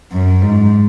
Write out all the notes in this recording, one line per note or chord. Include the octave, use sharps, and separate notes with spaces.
F#2
G#2